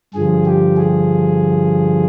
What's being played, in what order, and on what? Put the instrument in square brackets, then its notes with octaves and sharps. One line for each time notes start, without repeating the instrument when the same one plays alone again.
[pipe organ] G2 D3 F3 G#4
G4
G#4